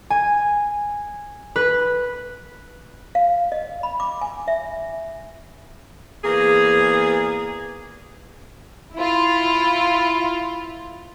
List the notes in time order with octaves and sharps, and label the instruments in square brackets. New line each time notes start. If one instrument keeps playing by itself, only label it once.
[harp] G#5
B4
[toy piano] F5
D#5
B5
D6
G#5
E5
[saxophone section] E2 A#3 G#4
[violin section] E4 F4